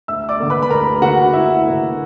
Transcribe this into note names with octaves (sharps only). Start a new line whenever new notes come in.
D2 E5 E6
D5 D6
D3 A#3
B4 B5
B5
D2 A#4 A#5
D3 A#3 F#4 F#5
D2 E4 E5
D3 A#3